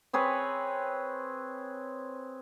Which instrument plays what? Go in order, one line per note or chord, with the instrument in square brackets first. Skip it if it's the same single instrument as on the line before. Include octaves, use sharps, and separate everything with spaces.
[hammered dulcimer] C4 G#4 B4 C#5